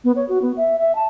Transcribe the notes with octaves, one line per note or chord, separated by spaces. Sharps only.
B3
C#5
F#4
B3
E5
E5
A5